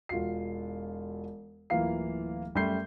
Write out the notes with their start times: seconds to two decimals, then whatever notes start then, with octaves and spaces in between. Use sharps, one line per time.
0.09 E1 F4 F#4 C7
1.70 D1 E3 A#3 F4 F5 C7
2.55 F#2 G3 A3 C6 G6 C7